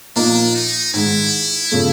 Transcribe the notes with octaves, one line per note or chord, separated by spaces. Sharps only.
A#2 F3 A#3 D4 D#4
D#4
G#2 D#3 G#3 E4
C#3 F3 A3